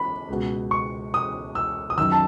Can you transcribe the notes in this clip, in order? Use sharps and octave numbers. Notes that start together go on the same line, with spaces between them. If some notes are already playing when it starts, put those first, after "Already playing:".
Already playing: B5
C#2 B2
C#6
D#6
E6
D#6
F#2 D#3 E6
A5